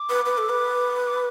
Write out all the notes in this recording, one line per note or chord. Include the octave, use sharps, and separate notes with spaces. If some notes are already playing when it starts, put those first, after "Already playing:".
Already playing: D6
B4
B4
A4
B4
D6